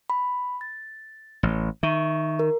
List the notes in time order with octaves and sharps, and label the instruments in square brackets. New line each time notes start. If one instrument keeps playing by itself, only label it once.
[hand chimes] B5
A6
[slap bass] A1
[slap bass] D#3 [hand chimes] E5 C#6
[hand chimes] A#4